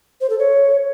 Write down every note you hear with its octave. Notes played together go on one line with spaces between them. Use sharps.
C5
A4
C#5